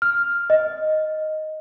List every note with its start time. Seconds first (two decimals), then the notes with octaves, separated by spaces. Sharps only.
0.02 F6
0.50 D#5